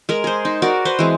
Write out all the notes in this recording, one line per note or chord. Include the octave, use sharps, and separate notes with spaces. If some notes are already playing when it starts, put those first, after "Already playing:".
G#3 A#4
G#4 C5
D#4
F#4 A#4 D5
B4 C5
E3 G#3 C4